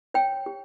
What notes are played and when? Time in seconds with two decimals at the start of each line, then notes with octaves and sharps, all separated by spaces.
0.14 C#5 G5
0.46 G4